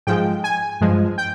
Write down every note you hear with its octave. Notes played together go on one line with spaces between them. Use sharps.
G#2 F3 G#3 G5
G#5
G2 F3 G#3
G5